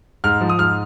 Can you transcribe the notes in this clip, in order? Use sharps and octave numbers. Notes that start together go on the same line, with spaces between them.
G#2 F6
F3
D#6
G#2 F6